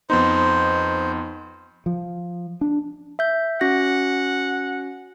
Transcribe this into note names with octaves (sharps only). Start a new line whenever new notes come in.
F2 B3 D#4 C5
F3
D4
E5 G6
C#4 F#4 F#5 A#6